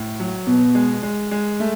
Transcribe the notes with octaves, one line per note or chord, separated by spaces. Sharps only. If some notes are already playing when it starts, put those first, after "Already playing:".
Already playing: A2
F#3
B2 B3
G#3
G#3
G#3
A3